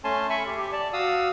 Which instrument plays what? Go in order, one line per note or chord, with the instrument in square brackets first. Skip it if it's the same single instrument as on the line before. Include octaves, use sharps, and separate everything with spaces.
[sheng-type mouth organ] A3 C#4 G#5 A5 C6
E5 G#5 B5 C#6
G4
G4
D5 A5
F#4 F5 D#6 E6